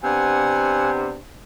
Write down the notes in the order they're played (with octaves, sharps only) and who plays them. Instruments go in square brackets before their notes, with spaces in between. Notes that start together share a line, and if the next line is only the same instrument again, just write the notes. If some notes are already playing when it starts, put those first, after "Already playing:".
[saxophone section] C3 B3 D4 [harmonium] F#5 G#5